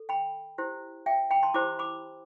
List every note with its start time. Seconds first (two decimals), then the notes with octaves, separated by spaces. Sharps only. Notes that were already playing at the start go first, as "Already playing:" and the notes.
Already playing: A4
0.09 G5 B5
0.58 E4 G4 C5
1.06 E5 G5
1.31 G5 B5
1.43 A5 C6
1.54 E4 G4 C5 B5 D6
1.79 B5 D6